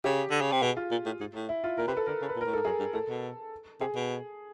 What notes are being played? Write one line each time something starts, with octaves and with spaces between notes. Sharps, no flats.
C#3 G4
D3
C#3
C3
B2 G#4
F4
A#2
A2
G#2
A2
E4
F4
A#2 A#4
C3 B4
A4
D3 A#4
C#3
B4
A#2
A2 A#4
G#2 A4
F#2 G#4
G2
A2 A4
B2
C3 G#4
B2